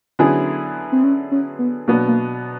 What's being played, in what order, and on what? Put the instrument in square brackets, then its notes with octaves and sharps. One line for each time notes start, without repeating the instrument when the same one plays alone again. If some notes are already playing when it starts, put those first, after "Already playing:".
[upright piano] D3 F#3 B3 E4 G#4 [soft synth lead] C#4
[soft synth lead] C4
C#4
C#4
B3
[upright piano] B2 F#3 B3 D4 [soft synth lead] A#3
[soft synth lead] A#3